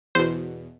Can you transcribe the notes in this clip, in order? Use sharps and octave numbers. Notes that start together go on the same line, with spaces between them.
E2 B2 C5